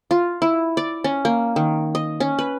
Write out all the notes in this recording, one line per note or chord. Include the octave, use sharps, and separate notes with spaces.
F4
E4
D5
C#4
A#3
D#3
D#5
C#4
B4